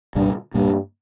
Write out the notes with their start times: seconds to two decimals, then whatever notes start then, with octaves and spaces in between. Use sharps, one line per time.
0.15 C2 G2 A#2 G3 A#3
0.54 C2 G2 A#2 G3 A#3